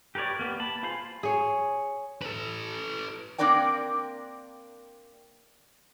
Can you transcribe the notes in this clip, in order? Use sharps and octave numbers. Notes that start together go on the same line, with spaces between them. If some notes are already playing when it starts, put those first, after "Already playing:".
G4 A#4 B4 C#5 D5
A#3 B3 G4
A5 B5
F4 G#4 C5 F5 B5
G#4 C#5
A4 B4
A#3 C4 D4 A#4 D5 G5